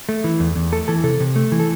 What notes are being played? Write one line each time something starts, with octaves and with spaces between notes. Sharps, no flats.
A3
E3
E2
E2
A3 A4
E3 A4
C3 A4
C3
A3
E3
A4